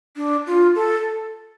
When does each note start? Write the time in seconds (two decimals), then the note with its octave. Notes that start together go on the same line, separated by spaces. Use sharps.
0.16 D4
0.47 F4
0.75 A4